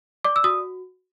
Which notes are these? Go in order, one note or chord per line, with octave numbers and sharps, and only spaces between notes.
D5 D6
E6
F#4 D#6